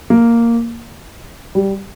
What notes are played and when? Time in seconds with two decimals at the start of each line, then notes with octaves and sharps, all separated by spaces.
0.10 A#3
1.55 G3